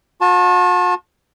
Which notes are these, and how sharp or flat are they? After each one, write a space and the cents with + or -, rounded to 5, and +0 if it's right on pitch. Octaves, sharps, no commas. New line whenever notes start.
F#4 -45 A5 +0